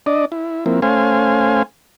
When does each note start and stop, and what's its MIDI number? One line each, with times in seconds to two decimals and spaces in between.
0.06 0.25 62
0.06 0.25 74
0.06 0.25 75
0.32 0.65 64
0.66 0.80 53
0.66 0.80 58
0.66 0.80 60
0.66 0.80 64
0.82 1.63 57
0.82 1.63 61
0.82 1.63 72
0.82 1.63 77
0.82 1.63 80